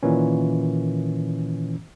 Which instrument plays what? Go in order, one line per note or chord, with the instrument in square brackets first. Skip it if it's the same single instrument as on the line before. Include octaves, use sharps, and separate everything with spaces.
[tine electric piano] A#2 D#3 E3 C#4